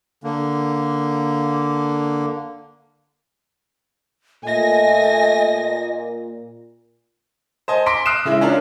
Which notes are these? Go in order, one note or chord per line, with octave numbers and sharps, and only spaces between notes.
D3 A#3
A#2 A3 D#5 G#5 A#6
C5 D#5 G#5 A5
C6 D6 A#6 B6 D7
D#6 F6 F#6 C7 D7 E7
C#3 G#3 E4
C#4 D4 F4 A#4